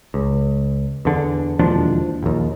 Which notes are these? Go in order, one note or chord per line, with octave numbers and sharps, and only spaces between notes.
C#2
E2 D3
E1 D#2 F3 D4
A#1 D#2